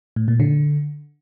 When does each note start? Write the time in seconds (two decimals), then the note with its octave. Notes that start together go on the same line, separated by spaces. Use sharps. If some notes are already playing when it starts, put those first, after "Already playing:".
0.16 A2
0.28 A#2
0.40 D3